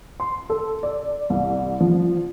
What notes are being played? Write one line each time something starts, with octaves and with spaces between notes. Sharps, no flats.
C6
A4
D5
C2
F3